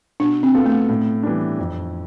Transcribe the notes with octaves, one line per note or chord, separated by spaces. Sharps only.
B2 D4
C4
B3 F4 A4
A3
A2
E3 G3 B3 D4
F2